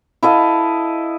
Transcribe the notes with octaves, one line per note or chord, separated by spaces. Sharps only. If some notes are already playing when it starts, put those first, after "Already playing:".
E4 A4 D#5 F5